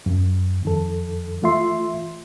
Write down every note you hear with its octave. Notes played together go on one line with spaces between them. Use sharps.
F#2
F2 D#3 A4
E3 A3 F4 E5 C6